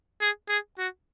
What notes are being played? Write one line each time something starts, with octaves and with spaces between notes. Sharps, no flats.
G#4
G#4
F#4